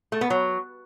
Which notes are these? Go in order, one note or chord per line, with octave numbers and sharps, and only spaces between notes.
A3
B3
F#3